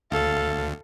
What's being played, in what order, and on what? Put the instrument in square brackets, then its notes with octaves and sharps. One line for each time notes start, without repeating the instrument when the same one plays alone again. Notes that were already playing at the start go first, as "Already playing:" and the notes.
[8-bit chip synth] D2 [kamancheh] A4 F5